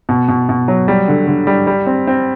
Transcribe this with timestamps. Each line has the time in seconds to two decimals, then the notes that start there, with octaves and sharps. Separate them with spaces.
0.09 B2
0.28 B2
0.49 B2
0.68 F#3
0.88 G3
1.08 D3
1.27 D3
1.47 G3
1.67 G3
1.87 C4
2.07 C4